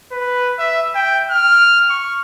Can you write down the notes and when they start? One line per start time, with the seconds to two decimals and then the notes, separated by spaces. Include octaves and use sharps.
0.12 B4
0.59 E5
0.95 G5
1.30 F6
1.90 C#6